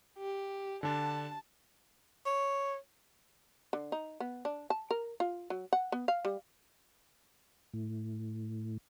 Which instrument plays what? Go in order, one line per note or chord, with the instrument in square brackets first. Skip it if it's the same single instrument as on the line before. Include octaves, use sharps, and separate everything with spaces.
[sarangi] G4
[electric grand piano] D3 D4 [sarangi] A5
[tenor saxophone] C#5
[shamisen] D3
D#4
B3
D4
A5
A#4
F4
F#3
F#5
B3
F5
G3
[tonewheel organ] A2